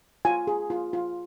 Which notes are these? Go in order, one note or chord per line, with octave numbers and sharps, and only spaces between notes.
F4 G#5
G#4
F4
F4